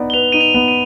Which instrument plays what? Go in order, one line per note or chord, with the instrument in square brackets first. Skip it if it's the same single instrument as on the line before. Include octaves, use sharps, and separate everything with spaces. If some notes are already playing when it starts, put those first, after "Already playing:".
Already playing: [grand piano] B3 D#4 D5
[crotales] G7
[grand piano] B4 [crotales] F7
[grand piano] D#4 [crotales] D#7
[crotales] F7
[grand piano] B3
[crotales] D#7